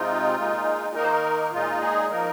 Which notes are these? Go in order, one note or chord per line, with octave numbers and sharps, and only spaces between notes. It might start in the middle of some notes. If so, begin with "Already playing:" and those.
Already playing: C3 G#3 C4 D#4 F4
A#2 G#3 D#4
D#3 A#3 D#4 A#4
C5
A#4
A#2 G#3 D#4 F4
G#4
F3 A#3 D#4 A#4